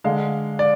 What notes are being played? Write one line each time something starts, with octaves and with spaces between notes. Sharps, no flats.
D3 G#3 F5
D5